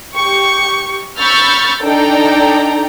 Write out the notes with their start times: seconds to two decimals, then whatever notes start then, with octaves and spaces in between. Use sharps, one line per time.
0.15 G4 C#6
1.19 B5 C#6 E6 F6 G6 A6
1.83 D4 D#4 A4 D5 G5 A#5